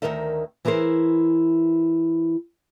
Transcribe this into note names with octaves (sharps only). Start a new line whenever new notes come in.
D2 A#2 D#3 A#4 D#5 E5
E3 E4 G#4 A#4 C5